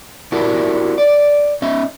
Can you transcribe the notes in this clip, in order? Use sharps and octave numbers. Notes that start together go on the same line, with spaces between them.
D4 E4 F#4 G4 A#4
D5
C#4 D#5 E5